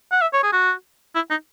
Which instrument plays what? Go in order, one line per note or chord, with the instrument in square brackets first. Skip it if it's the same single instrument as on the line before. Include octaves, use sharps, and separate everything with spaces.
[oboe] F#5
E5
C#5
G#4
F#4
E4
D#4